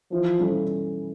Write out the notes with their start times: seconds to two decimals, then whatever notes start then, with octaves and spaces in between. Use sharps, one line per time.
0.12 E3 F3
0.39 G3 C#4 E4 A4